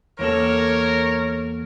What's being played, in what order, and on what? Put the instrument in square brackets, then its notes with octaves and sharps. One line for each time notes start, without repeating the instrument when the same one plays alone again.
[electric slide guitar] E2 A#3 A4 [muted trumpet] A#4 [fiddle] C#5